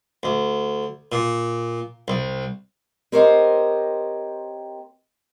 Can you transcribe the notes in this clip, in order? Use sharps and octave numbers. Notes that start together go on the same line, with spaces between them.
D2
A#2
C2
C4 G4 A#4 C5 C#5 D#5